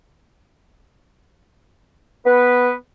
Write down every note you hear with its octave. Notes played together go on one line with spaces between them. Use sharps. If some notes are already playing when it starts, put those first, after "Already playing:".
B3 B4